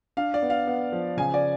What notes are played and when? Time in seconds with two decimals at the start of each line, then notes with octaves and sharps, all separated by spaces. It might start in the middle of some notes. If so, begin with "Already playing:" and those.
0.17 D4 F5
0.34 D5
0.42 B3
0.50 F5
0.67 B3
0.92 F3
1.17 C#3 G#5
1.34 D5